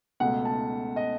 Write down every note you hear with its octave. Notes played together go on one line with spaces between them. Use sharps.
C#2 B2 A3 F#5
A5
D#5